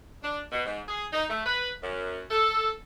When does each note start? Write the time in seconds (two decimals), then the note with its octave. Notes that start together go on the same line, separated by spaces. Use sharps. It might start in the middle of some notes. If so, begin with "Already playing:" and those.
0.24 D4
0.52 B2
0.65 G#2
0.88 G#4
1.13 D#4
1.29 A3
1.45 B4
1.82 F#2
2.31 A4